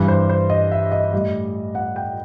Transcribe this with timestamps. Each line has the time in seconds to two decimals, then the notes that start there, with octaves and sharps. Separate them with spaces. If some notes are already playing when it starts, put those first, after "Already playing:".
Already playing: G2 E3 G3
0.08 C5
0.29 C5
0.50 D#5
0.71 E5
0.92 D#5
1.13 A2 G3 D#5
1.75 F#5
1.96 G5